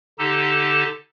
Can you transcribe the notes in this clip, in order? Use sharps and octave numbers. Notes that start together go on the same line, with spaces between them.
D3 D#4 G4 A4 A5